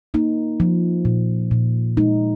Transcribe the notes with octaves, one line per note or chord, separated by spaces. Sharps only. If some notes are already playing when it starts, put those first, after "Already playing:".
A#3 D#4
F3
A#2
A#2
G#3 D#4